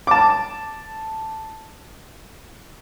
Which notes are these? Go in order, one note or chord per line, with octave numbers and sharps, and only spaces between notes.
A5 D6